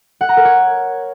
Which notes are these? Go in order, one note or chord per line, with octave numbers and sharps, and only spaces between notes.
F#5
A#5
A#4
C#5